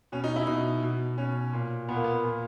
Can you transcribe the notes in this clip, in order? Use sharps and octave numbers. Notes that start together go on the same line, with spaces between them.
B2 C#4
D#4
E4
B2 D#4
B2
B2 C#4
A#2
A#2 B3
A#3
B3
A#2